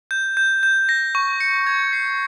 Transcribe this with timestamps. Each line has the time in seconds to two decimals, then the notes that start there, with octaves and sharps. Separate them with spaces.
0.11 G6
0.37 G6
0.63 G6
0.89 A#6
1.15 C#6
1.40 C#7
1.67 G#6
1.93 C7